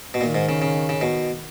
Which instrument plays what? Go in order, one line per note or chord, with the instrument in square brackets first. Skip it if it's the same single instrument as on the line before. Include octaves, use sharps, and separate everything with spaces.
[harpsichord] B2
[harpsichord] A#2 [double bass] D#3
[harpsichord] G#2
C#3
C#3
C#3
B2